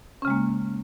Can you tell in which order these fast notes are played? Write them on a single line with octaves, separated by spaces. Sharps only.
C#4 C#3 G#3 A#3